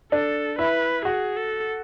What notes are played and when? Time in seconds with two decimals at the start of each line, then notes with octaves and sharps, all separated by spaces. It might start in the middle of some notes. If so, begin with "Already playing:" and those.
0.12 D4 A4
0.59 E4 B4
1.05 F#4 G#4
1.37 A4